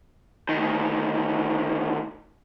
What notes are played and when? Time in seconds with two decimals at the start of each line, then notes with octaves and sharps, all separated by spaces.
0.49 D2 D#3